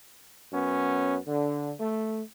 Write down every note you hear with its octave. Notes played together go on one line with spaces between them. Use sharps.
F#2 B3 C#4
D3
A3